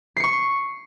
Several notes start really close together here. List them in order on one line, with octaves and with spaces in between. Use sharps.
C7 C#7 C#6